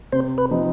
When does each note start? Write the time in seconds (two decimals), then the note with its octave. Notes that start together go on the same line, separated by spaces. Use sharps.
0.12 C3 C5
0.38 B4
0.51 F3 C4 D#4